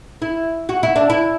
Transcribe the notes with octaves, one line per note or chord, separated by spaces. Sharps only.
E4
F#4
E4
D4
E4